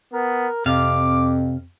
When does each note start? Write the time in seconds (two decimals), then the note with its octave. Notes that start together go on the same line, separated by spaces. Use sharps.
0.13 B3 A#4
0.66 F2 C3 F5 D6